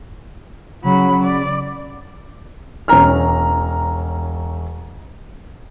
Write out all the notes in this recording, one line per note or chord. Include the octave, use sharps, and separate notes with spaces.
C#3 F#3 B5
D5
E1 C#4 A#5 F6